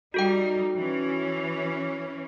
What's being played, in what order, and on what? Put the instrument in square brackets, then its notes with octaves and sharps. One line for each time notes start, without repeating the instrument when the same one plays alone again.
[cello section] G3 D#4 [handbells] F#4 A4 G5
[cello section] E3 C#4